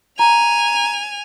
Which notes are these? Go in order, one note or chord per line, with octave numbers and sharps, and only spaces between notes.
G#5 A#5 F7